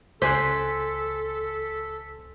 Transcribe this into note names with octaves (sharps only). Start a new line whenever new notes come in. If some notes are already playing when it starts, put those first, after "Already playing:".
C#2 A4 C5 G#5 F#6 B6